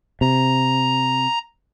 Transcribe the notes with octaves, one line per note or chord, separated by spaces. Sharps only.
C3 A#5